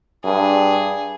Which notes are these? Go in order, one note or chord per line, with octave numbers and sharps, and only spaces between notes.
G2 G#4